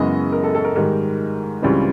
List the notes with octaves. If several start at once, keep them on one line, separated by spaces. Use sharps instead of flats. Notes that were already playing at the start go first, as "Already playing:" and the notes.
Already playing: F#2 C#3 E3 G#3 B3 D#5
A#4
A4
A4
A#4
G#2 D#3 G3 A#4
C#2 C#3 E3 G3 C4